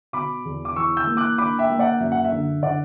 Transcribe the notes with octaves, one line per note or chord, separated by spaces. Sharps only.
B2 B5 D6
E2
D6
E3 C#6 E6
E6 G6
A#3
D6 F#6
D4 B5 D6
E5 G5
A#3
D5 F#5
F#2 E5
F#5
E5
D3
D3 D5 F#5